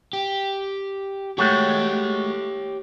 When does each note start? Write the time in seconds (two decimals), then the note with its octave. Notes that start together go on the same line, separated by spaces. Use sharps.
0.13 G4
1.38 G#3 A3 F#4 G4 C#5